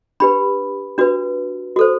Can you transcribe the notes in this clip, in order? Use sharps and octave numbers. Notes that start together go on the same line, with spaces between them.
D4 G4 B4 B5
D4 F#4 B4
F#4 A4 C5